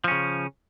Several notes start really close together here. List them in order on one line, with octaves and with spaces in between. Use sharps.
F3 C#4 C#3